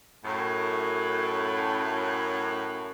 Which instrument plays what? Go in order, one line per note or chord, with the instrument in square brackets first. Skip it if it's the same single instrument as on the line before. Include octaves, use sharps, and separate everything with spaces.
[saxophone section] F#2 A2